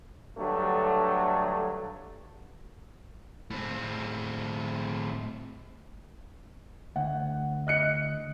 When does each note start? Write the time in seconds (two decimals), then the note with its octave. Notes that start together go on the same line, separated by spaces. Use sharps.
0.37 G2 D3 F#3 A3
3.50 A2 C4
6.96 D2 F#5
7.67 D#5 F#6 C#7